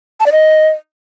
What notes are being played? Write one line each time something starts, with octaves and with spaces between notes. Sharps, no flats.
A5
D5
D#5